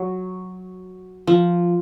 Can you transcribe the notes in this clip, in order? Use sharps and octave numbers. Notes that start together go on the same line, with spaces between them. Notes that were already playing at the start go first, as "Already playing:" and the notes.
Already playing: F#3
F3